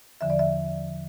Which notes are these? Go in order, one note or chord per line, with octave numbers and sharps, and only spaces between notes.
E2 D3 F3 E5
D5
E5